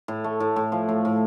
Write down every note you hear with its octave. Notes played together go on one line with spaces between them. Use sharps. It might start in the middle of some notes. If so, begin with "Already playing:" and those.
A2
A3
A2
A2
F3
A2
A2